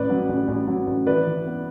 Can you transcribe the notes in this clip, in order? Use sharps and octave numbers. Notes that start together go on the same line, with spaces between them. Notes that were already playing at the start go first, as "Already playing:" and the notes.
Already playing: A1 B4 D5
F#3
A1
A1
F#3
A1
E3 B4 D5
E3
B3